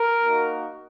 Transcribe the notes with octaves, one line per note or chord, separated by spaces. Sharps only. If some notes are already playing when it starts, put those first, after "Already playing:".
Already playing: A#4
A#3 D#4 F#4